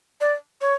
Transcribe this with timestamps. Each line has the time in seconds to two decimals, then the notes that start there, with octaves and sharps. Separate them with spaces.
0.21 D5
0.61 C#5